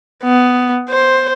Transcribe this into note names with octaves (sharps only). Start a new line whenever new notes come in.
B3
C5